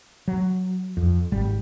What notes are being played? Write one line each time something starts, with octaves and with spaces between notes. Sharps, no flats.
F#3
F2
G#1 G3